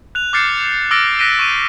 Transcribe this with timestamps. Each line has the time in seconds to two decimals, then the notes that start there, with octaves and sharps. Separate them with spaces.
0.15 F#6 F7
0.33 D6 F6 G6 A6 C7 C#7
0.91 D6 E6 F6 A6 A#6 D7
1.19 F#6 A#6 B6 D7 D#7 G7
1.39 C#6 D#7